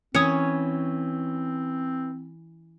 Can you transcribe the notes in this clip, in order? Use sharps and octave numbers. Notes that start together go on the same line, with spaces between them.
E3 C4 C#4 D#6 G#6 C#7